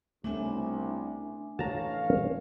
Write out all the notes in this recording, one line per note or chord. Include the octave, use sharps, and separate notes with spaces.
C2 A3 B3 C#4 D4 E5 G#5
A1 C#5 F5 A5 A#5